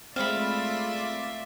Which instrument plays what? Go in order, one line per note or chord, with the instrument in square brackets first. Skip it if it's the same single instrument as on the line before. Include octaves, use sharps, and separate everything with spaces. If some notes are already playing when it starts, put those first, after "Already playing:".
[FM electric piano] G#3 C4 [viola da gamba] A3 F4 D5 [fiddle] E5 [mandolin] F5 B5